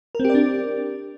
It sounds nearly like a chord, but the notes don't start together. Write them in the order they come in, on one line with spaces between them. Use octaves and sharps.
A#4 C4 G4 D5 D4